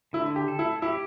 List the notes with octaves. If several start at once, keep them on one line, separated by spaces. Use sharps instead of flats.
D3 E4
G4
A4
E4
E4 G4